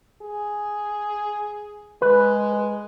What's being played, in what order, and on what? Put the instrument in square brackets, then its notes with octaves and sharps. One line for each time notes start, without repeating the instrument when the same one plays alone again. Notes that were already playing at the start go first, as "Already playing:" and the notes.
[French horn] G#4
[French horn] G#3 [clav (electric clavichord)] B4